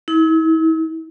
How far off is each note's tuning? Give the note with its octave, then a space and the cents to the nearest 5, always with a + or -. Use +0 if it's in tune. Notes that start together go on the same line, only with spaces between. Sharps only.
E4 -40